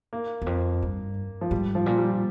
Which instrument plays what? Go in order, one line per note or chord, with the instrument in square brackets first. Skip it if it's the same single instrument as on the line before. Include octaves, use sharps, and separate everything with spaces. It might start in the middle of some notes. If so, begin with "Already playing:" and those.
[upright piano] A#3
[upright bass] E2
F2
G2
[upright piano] F3
[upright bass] G#2 [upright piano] G3
[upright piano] F3
[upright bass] A#2
[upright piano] G3